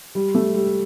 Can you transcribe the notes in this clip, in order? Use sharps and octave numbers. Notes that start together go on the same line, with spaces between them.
G3
A3
G3